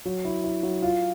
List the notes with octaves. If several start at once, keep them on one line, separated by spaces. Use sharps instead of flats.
F#3
E4
E4
F#3
F4